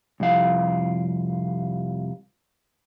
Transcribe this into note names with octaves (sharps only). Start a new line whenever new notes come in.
C2 F2 F5